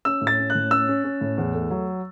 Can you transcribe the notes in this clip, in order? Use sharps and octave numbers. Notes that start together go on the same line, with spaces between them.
C#4 E6
A2
A6
C#4
F#6
A2
C#4 E6
C#4
C#4
A2
E2
A3
F#3